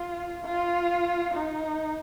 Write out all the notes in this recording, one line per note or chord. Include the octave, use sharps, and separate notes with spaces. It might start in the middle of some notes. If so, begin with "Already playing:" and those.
Already playing: F4
F4
D#4